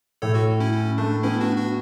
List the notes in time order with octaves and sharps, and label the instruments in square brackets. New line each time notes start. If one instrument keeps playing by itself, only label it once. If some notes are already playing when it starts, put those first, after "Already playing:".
[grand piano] A2 [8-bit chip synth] A4 C#5
[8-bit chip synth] F#4 A4
C#4 E4
C#4
[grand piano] A3 [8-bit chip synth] D4
[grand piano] B3 [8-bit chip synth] C#4 E4
[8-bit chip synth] D4 F#4
D4 F#4